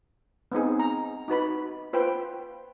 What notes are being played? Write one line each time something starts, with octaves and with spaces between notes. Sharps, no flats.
B3 C4 D#4 G#4
A#5
D#4 F#4 B4 B5
F4 B4 C5 G5